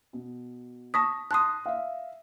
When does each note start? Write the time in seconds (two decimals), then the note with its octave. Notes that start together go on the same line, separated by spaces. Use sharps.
0.13 B2
0.94 A5 C#6 D#6 A#6 B6
1.31 A5 C6 D#6 F#6 D#7
1.66 E5 F5